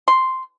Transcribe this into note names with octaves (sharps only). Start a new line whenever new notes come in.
C6